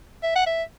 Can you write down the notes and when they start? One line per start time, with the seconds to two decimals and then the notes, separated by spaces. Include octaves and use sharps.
0.23 E5
0.36 F#5
0.46 E5